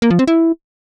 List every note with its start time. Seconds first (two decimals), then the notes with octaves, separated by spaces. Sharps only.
0.02 A#3
0.11 F3
0.19 C4
0.28 E4